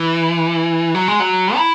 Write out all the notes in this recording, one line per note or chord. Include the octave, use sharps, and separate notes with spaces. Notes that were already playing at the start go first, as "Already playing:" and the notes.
Already playing: E3
F#3
G#3
F#3
E4